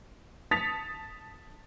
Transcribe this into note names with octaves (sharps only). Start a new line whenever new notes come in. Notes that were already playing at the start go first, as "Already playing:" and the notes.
A5 D#6 A6 B6 C#7 F7